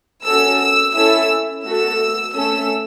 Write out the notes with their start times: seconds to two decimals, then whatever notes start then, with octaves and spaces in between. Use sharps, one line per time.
0.26 C#4 F#4 A4 E6
0.61 E6
0.96 C#4 E4 A4 E6
1.66 A3 F#4 A4 E6
2.35 A3 C#4 A4 E6